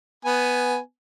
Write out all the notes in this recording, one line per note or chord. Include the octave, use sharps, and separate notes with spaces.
B3 G#5